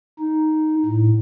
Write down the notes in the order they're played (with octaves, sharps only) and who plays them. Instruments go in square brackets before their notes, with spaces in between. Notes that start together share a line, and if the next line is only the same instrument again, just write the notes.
[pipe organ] D#4
A2